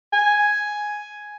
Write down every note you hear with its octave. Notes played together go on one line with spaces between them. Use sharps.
G#5